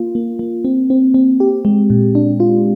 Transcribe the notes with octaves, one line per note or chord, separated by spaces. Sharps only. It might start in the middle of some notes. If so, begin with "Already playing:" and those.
Already playing: A#3 F4
A#3
A#3
C4
C4
C4
G4
G#3
A#2
D4
F4